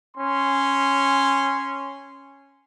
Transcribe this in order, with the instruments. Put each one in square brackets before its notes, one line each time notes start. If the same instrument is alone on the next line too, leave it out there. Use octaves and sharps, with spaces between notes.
[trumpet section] C#4 C6